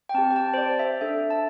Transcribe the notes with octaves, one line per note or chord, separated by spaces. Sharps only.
G5
C4 G4 A5
G5
A5
C5
D5
E5
D4 A4 E5
A5